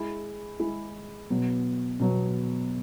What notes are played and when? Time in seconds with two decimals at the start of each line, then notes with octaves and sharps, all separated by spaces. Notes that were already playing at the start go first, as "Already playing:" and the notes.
Already playing: G#3 E4 G#4
0.60 G#3 E4 G#4
1.30 B2 F#3 B3
2.00 B2 F#3 B3